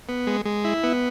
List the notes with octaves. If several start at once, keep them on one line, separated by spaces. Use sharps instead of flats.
B3
G#3
G#3
E4
B3